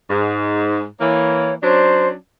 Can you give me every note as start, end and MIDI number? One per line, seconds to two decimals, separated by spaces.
0.09 0.86 44
1.00 1.53 52
1.00 1.53 58
1.00 1.54 73
1.63 2.16 54
1.63 2.16 61
1.63 2.16 62
1.63 2.08 72